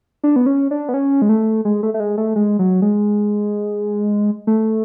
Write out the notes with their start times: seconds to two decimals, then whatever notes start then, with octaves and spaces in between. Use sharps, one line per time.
0.24 D4
0.36 B3
0.46 C#4
0.71 D4
0.89 B3
0.94 C#4
1.22 G#3
1.29 A3
1.65 G#3
1.83 A3
1.94 A3
2.00 G#3
2.18 A3
2.36 G#3
2.59 F#3
2.82 G#3
4.47 A3